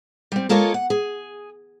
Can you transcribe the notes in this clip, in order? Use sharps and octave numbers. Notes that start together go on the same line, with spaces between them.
G3 C4
G#3 A#3 F4 A4 A#4 C#5
F#5
G#4